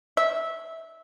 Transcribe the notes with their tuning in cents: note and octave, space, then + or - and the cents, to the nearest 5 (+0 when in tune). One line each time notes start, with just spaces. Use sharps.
E5 -15